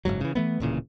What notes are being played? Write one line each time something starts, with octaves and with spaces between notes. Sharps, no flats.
F#1 C2 G#2 F#3
C#3 E3
E3 A3 B3
D1 A#2 C#3 E3